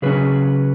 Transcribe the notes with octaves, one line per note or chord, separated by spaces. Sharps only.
C#3 F#3 C#4 G#4 B4